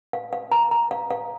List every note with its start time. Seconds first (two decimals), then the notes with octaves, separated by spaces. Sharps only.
0.13 F5
0.33 F5
0.52 A#5
0.71 A#5
0.91 F5
1.10 F5